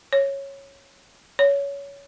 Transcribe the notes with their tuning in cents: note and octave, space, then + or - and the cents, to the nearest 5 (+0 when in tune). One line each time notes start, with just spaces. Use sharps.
C#5 -10
C#5 +20